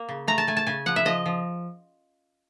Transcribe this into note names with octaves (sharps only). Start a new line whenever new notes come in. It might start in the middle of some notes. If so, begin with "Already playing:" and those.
Already playing: A#3
C#3
A3 A#5
A5
A3 G#5
A5
C#3 G#5
F3 F#5
E5
F3 D#5
F3